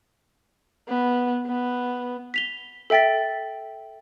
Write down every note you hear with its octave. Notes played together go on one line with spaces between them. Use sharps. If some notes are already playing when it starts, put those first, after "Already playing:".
B3
B3
B6 F7 G7
A4 E5 G5 A6 B6